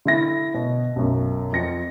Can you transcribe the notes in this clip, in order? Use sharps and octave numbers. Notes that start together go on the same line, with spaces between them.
D3 E4 A#6
B2
B1 F#2
F2 A#6 C#7